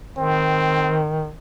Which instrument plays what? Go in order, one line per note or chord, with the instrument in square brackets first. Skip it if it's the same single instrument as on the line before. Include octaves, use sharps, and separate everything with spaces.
[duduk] D#3 [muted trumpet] C4